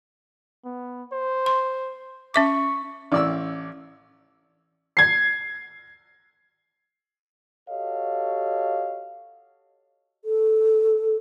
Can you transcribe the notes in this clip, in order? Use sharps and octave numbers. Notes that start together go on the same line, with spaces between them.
B3
C5
C6
C#4 E5 C#6 D6
A1 D5 E6
G#6 C7
F#4 G4 A4 C#5 D#5 F5
A4